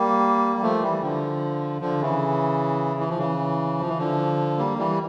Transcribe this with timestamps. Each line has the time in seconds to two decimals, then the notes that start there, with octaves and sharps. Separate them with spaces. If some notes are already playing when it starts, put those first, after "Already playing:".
Already playing: G3 A#3
0.57 G3
0.62 F3 A3
0.82 E3 G3
1.02 D3 F3
1.81 D3 F3
2.01 C#3 E3
3.00 E3
3.09 F3
3.18 C#3 E3
3.80 F3
3.88 E3
3.98 D3 F3
4.58 G3 A#3
4.78 E3 G3